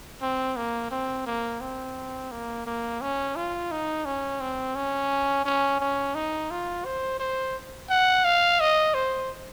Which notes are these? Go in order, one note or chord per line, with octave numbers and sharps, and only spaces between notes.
C4
A#3
C4
A#3
C4
A#3
A#3
C#4
F4
D#4
C#4
C4
C#4
C#4
C#4
D#4
F4
C5
C5
F#5
F5
D#5
C5